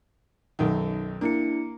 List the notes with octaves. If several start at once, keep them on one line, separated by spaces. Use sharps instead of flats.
B1 F#2 D#3
A#3 D4 E4 C#7